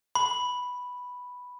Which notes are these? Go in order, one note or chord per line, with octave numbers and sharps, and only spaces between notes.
B5